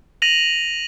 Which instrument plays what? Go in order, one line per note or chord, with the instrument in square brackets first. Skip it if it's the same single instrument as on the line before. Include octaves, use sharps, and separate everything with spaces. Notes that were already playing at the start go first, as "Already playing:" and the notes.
[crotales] A#6 D#7 F7 F#7